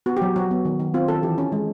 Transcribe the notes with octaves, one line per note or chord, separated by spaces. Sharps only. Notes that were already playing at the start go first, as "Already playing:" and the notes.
B3 F#4
G4
F#3
F#3 F#4
B3
D#3
D#3
C4 F4
D#3 A4
E3 G4
C#4
G#3